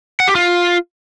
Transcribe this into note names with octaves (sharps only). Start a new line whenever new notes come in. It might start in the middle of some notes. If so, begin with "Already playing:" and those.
F#5
G4
F4